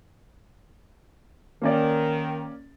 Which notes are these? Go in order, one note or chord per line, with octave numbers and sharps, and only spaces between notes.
D#3 A#3 C#4 D5